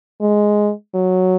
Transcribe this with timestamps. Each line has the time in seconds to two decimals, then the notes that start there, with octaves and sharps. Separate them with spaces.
0.21 G#3
0.94 F#3